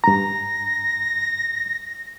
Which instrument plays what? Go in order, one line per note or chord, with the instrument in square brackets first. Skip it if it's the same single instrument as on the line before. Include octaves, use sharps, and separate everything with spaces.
[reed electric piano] G2 A#5 [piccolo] A#6